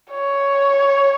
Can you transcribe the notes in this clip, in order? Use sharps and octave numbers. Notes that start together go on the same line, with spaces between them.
C#5